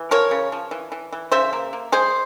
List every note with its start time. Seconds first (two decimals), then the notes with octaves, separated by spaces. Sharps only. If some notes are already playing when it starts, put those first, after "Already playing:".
Already playing: E3
0.11 F3 A#4 C#5
0.31 C#3
0.52 F3
0.71 E3
0.92 E3
1.13 E3
1.32 C#3 C5 E5
1.53 A#3
1.73 A#3
1.92 G#3 G#4 C5